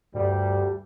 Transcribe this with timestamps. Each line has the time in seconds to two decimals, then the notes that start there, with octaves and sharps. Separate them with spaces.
0.14 D2 G2 G3